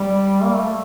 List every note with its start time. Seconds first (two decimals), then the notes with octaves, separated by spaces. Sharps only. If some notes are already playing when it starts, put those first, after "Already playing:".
Already playing: G3
0.44 A#3
0.54 A3